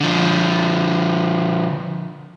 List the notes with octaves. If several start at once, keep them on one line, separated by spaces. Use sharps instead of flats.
D3 F3